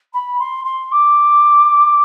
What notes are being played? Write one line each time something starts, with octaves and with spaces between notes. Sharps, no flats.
B5
C6
C6
D6